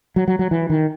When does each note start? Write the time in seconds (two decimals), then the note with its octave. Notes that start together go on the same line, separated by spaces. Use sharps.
0.16 F#3
0.28 F#3
0.39 F#3
0.51 E3
0.70 D#3